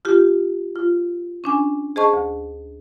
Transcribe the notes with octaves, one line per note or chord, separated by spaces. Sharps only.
F4 G4
F4
C#4 D4 G#5
G#4 C5 D#5 A5 C#6
D2